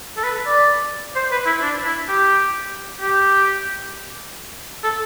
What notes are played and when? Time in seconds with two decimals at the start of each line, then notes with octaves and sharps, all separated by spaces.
0.17 A4
0.24 B4
0.47 D5
1.16 C5
1.32 B4
1.46 E4
1.62 D4
1.85 E4
2.08 G4
3.00 G4
4.84 A4